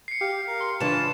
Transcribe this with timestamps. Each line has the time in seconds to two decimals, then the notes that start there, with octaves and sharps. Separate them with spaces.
0.08 C7 C#7
0.21 G4 F5
0.47 A#4 F5
0.60 C6
0.80 C#3 E3 D4 F4 B4 A5 E7